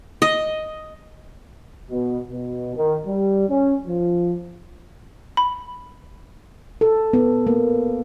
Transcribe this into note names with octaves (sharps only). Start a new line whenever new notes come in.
D#5
B2
B2
D#3
G3
C#4
F3
B5
A4
B3
A#3